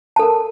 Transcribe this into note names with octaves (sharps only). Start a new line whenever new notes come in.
A4 A#4 A5